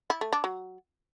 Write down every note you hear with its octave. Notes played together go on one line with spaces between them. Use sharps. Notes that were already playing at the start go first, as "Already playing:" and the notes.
E4
A3
D4
F#3